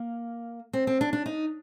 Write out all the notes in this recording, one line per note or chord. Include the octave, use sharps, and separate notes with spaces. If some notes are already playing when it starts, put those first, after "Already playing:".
Already playing: A#3
C4
C4
D4
D4
D#4